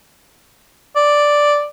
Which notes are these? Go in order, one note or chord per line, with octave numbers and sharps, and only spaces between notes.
D5